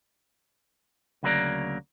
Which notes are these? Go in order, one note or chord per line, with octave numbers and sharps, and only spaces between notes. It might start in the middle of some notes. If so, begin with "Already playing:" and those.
D2 C#3 F#3 A#3 A#4 D5